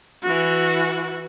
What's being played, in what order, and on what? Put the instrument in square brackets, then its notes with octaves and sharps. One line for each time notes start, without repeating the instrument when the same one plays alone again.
[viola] E3 F#4